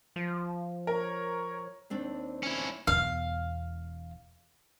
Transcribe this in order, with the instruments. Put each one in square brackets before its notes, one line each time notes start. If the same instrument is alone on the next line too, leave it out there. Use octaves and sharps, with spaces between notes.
[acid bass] F3
[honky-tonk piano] A#4 [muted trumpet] C#5
[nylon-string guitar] D#2 C4 D4
[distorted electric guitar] C#4 E4
[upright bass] E1 E2 [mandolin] F5